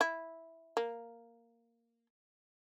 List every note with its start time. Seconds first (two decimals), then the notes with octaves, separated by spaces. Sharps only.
0.01 E4
0.77 A#3